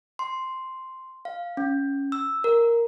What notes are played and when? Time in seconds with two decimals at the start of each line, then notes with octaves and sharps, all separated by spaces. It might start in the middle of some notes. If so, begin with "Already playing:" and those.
0.19 C6
1.25 F5
1.57 C#4
2.12 E6
2.44 A#4